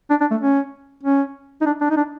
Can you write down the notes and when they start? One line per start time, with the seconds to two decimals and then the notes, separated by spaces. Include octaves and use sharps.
0.10 D4
0.21 D4
0.31 A3
0.41 C#4
1.03 C#4
1.61 D#4
1.66 D4
1.81 D4
1.90 D#4
1.97 D4